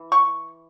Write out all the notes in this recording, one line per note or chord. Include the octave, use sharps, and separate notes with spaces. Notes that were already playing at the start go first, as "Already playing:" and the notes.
Already playing: E3
C#6